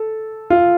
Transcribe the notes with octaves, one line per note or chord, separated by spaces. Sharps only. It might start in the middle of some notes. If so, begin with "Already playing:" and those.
Already playing: A4
F4